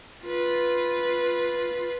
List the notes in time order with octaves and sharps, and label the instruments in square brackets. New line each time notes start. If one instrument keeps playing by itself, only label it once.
[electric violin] F4 B4